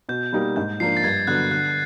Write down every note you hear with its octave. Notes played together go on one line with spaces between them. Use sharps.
B2 G6
G3 A#3 D#4 G4
G#2 G6
F3 A#3 D4 C7
A6
G2 G#6
D3 F#3 B3 F#6
D3 F#6